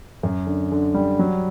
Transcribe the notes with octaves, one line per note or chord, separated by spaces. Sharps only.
F#2
D3
D3
G3
F#3